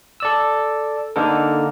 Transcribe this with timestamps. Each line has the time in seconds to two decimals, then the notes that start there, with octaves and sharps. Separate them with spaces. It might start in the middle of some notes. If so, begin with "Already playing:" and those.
0.20 A4 D5 E6
1.16 D3 A#3 D#4 A4 A#4